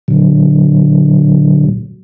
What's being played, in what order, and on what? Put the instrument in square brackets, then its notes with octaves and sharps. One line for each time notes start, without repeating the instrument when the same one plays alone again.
[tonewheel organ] A#2 D3 F#3